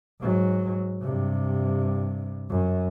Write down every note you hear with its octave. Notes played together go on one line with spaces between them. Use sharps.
G#2 F#3
G2 C3
F#2